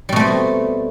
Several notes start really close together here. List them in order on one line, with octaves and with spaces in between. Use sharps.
G3 B2 A3 C4